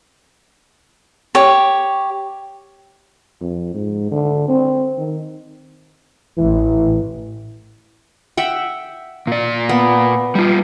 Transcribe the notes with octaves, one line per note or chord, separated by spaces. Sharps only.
G4 C#5
F2
G#2
D3
C4
D#3
A1 E3
E5 F#5 G5
A#2 D5
B3
G3 F4